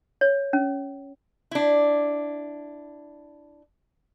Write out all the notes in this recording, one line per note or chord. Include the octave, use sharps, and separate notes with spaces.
C#5
C#4
D4 E4